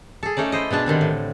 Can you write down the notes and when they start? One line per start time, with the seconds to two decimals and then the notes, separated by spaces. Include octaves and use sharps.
0.23 G#4 A4
0.37 A3 C#4 D#4 D5
0.52 E4 C5 D#5
0.70 B2 G#3 D4 A5
0.86 D3 D#3 G3 C4
1.01 A2